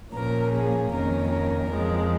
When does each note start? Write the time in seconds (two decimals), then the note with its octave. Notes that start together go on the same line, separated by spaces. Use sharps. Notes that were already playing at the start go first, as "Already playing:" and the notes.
0.14 A#2 F3 A#3 C#4 A#4
0.52 G#4
0.91 F2 D#3 A#3 C#4 A#4
1.29 A#4
1.68 F2 F3 G#3